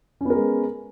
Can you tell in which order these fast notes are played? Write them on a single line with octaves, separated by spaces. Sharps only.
C#4 B3 A#4 G#3